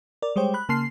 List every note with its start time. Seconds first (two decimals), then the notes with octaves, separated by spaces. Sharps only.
0.22 A#4 D5
0.36 G3 G#3 C5 C#5 G5
0.54 B5 F#6
0.69 C#3 A#3 A5 C6 F6 C7